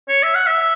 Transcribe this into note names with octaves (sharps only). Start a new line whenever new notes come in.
C#5
E5
F#5
E5